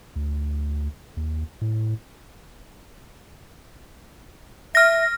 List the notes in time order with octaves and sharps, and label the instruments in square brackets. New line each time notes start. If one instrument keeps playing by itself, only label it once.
[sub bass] D2
D#2
A2
[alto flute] E5 [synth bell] F6 A#6